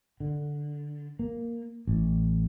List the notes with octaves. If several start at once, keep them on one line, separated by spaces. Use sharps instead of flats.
D3
A#3
A1